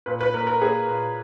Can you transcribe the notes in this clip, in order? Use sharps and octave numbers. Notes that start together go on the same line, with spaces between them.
A#2 B4
B4
A#3 A#4
A#4
A#3 G#4
A#2